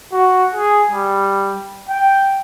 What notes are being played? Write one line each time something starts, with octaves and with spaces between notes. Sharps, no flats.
F#4
G#4
G3
G5